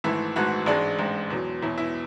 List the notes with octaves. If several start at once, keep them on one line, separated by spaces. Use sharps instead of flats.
G#1 G#2 E3 A3 E4
G#1 G#2 E3 A3 F#4
A1 G#2 G#3 D4
A1 G#2 G#3
E2 B2 F#3
E2 B2 F#3 E4
E4